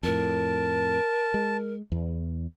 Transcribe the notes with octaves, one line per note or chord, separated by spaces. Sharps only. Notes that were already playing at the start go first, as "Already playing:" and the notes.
F2 A2 A#4 A5
G#3
E2